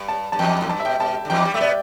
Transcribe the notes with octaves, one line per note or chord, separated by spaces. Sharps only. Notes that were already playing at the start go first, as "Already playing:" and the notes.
Already playing: G2
A5
G2 A5
E2 G5
A2
G2 A5
E5
B2 G5
B2 A5
D3
E2 E3 G5
G2 G3
A3 E5
B2 B3 D5